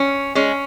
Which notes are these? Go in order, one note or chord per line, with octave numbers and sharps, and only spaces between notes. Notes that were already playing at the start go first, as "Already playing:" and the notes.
Already playing: C#4
G#3 C#4